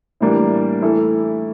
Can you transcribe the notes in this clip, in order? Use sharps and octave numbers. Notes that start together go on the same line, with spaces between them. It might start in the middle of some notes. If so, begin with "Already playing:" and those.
A2 E3 G3 A#3 D4
E3 A3 E4 A4